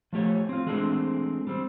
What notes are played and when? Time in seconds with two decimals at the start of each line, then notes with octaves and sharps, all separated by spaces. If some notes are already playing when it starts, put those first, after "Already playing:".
0.13 F3 A3 G4 C#5
0.49 C4 F4
0.66 E3 G#3 A3 C4 D4
1.47 G3 C4